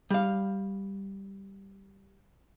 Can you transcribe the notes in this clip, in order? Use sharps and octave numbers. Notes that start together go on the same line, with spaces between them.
G3 F5